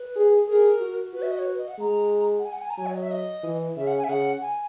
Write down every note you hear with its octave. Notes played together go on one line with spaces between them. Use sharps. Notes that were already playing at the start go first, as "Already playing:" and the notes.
Already playing: B4
G#4
G#4 A#4
F#4
F#4 B4
E5
D#5
C#5
B4
D#5
F#5
G#3 A#5
F#5
G#5
F#5
G#5
A#5
F#3 G#5
C#5
D#5
E5
D#5
E3
C#3 E5
F#5
G#5
E5
C#3 F#5
G#5